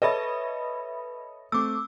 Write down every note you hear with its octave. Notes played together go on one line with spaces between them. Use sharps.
A4 B4 C#5 D#5 E5 B5
A3 C4 D6 E6